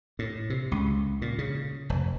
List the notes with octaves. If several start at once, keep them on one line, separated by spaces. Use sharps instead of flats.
A2
C3
C#2
A#2
C#3
F1